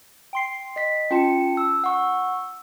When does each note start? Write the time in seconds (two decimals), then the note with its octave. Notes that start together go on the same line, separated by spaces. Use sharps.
0.33 G5 C6 C7
0.76 D#5 B6
1.11 C#4 F4 G5 A5 C#7
1.57 E6
1.84 F#5 C#6 E6